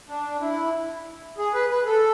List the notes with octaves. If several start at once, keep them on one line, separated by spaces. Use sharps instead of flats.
D4
E4
G#4
B4
B4
A4